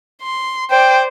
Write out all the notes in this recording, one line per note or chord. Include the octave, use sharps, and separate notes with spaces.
C6
C5 D5 G5